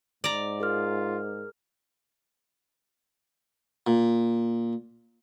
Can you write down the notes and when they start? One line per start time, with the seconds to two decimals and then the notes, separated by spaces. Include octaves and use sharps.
0.24 G#2 D5 A#5
0.60 F4 G#4 A#4 F6
3.87 A#2